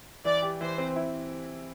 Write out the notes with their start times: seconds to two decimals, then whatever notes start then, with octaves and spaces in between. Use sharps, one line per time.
0.25 E3 D5
0.42 G4
0.61 E3 C5
0.78 C4
0.96 E4